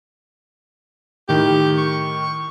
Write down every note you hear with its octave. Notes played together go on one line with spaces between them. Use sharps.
A2 D#3 G4
C#6